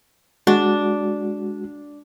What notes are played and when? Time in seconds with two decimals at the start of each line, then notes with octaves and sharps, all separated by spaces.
0.47 G#3 D4 F#4